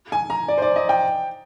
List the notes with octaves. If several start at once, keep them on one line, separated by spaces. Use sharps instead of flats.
G#5
A#5
D5
C5
D5
D#5
G5